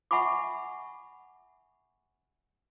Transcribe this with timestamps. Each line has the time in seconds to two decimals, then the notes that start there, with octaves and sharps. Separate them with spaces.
0.11 E5 F#5 G#5 B5 C#6 D6